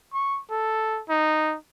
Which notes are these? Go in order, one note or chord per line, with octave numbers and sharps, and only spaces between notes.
C#6
A4
D#4